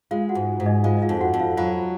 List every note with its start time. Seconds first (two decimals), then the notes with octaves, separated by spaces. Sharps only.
0.11 G#3 F4 F5
0.29 F#4 F#5
0.35 G#2
0.60 G#2
0.66 D#4 D#5
0.84 G#3 F4 F5
0.97 D#5
1.02 F4 F5
1.09 F2
1.21 F#4 F#5
1.34 F2
1.40 F4 F5
1.57 F#3 F4 F5